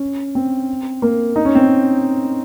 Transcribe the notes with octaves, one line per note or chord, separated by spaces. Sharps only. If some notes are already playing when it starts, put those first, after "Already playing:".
Already playing: C#4
C4
A#3
D#4
C#4
C4
C#4